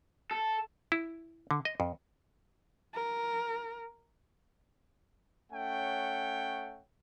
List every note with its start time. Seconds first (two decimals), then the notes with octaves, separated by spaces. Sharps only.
0.31 A4
0.92 E4
1.51 D3
1.65 D#5
1.80 F2
2.94 A#4
5.52 A3 C#4 C#5 F#5 G5